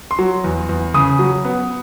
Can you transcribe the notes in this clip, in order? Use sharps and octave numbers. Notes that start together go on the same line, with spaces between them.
C6
F#3
E2
E2
C#3 D#6
F#3
B3